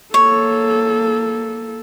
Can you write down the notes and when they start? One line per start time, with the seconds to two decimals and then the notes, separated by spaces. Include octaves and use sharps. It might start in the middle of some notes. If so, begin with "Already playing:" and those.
0.14 A#3 A4 C#5